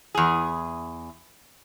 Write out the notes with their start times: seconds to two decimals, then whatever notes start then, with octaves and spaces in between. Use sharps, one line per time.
0.15 E2 G#4